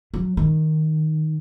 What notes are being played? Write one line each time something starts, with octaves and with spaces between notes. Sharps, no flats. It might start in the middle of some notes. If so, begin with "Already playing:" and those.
F#3
D#3